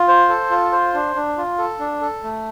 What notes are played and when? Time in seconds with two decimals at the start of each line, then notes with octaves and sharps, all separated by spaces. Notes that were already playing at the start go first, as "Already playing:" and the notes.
Already playing: F4
0.08 C5
0.29 A4
0.51 F4
0.72 C5
0.94 D4
1.15 D4
1.37 F4
1.58 A4
1.79 D4
2.01 A4
2.23 A3